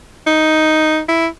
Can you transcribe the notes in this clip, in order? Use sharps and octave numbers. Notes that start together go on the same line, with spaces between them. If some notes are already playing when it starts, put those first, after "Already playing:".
D#4
E4